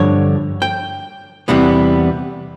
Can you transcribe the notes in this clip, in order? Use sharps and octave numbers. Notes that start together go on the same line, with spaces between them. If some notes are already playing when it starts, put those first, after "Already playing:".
Already playing: G2 D3 F3 C#5
G5
E2 C3 E3 G3 B3 F#5